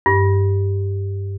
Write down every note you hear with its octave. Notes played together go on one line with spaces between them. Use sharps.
G2